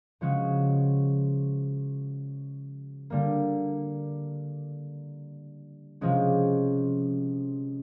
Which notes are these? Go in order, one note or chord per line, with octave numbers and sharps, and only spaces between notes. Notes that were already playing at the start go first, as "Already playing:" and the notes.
C#3 F3 G#3 C#4 F#4
D3 G3 A#3
C3 F3 G#3 C#4